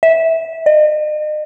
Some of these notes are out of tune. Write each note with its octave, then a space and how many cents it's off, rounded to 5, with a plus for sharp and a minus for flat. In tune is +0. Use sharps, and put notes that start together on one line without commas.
E5 -15
D#5 -40